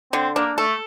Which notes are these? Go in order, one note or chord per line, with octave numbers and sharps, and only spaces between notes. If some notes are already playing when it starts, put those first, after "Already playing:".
D3 C4
A#3 D4
A3 A4